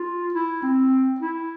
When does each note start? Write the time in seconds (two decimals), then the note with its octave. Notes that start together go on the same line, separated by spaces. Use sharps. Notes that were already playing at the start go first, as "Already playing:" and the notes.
Already playing: F4
0.34 E4
0.63 C4
1.20 E4